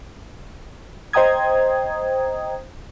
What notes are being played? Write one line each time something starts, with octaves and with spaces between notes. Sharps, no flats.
C5 D#5 G5 A#5 D#6 G#6